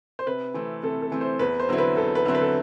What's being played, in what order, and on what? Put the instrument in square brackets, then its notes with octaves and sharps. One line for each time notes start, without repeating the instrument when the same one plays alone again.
[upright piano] C5
[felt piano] C3 [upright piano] B4
[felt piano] E3 A3 C4
[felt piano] C3 [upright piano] A4
[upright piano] A4
[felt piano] E3 A3 C4
[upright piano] C5
[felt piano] E2 [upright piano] B4
[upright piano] C5
[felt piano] D3 F#3 C4 E4
[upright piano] B4
[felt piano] E2 [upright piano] A4
[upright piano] B4
[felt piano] D3 F#3 C4 E4
[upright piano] B4
A4